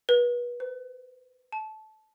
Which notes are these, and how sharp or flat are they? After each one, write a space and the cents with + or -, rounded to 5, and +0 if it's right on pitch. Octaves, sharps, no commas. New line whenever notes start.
B4 -30
B4 +45
A5 -20